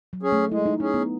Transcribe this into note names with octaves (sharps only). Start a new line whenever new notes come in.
F#3
C#4 G#4
A3
G#3 E4
D#4
C#4 D#4 G#4
B3